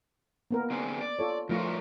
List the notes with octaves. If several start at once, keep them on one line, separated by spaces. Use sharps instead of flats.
A#3 B3 A#4
D3 C4 G#4
D5
F4 A4 C#5
G2 F3 A3 F4 A#4 C#5